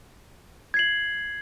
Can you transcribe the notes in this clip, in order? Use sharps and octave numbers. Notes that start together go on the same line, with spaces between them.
G#6 C7 F#7